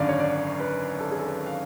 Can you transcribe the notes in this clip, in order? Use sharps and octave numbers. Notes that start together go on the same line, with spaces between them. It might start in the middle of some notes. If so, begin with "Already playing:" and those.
Already playing: G#1 F#2 D3 D5 F5
C#5
D5
B4
A4
G#4
A4
B4
F5